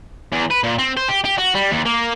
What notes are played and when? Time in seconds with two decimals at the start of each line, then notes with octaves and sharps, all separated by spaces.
0.32 E2
0.50 B4
0.63 A#2
0.78 C4
0.97 C5
1.09 G4
1.25 G4
1.38 F#4
1.55 G3
1.71 D#2
1.86 A#3